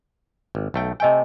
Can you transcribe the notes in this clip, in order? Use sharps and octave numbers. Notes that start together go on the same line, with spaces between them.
G#1
B1 A3 G5
C3 A3 D#5 G5 G#5